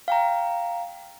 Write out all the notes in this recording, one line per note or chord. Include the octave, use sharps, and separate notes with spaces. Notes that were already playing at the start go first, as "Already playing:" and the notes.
F5 G5 A#5